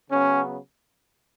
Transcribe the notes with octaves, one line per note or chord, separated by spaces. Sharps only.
C#3 F#3 B3 C#4